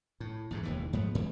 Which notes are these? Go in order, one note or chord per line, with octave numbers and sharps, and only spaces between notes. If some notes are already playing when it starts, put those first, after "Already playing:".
A2
E2 G#2 B2
E1 D#2 E3
G#2 F3 B3
G#2 E3